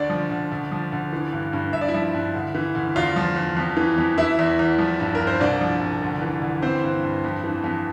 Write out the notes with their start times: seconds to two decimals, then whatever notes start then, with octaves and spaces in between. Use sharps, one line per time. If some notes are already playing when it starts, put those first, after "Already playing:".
Already playing: D2 D4 D5
0.10 F3
0.30 D2
0.52 D2
0.72 F3
0.92 D2
1.13 E3
1.33 G2
1.53 G2
1.73 G2 E5
1.81 D5
1.88 E4 E5
1.94 F3
2.14 G2
2.35 D2
2.55 E3
2.75 D2
2.96 E2 F4 F5
3.16 F3
3.36 E2
3.57 F2
3.77 E3
3.98 F2
4.18 E3 E4 E5
4.39 E2
4.59 E2
4.79 F3
5.00 G2
5.15 A#4
5.20 G2
5.27 C5
5.40 C2 D4 D5
5.61 F3
5.81 C2
6.02 D2
6.22 E3
6.42 D2
6.62 E3 C4 C5
6.83 G2
7.04 G2
7.24 F2
7.44 E3
7.64 F2